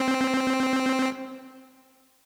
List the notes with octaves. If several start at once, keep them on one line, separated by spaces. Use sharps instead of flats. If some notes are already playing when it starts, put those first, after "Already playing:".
Already playing: C4